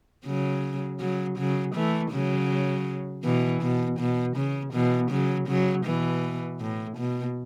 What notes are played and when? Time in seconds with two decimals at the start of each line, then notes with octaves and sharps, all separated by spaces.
0.26 C#3 F#3
1.00 C#3 F#3
1.38 C#3 F#3
1.75 E3 A3
2.12 C#3 F#3
3.24 B2 E3
3.62 B2
3.99 B2
4.36 C#3
4.74 B2 E3
5.11 C#3 F#3
5.48 C#3 F#3
5.86 B2 E3
6.61 A2
6.97 B2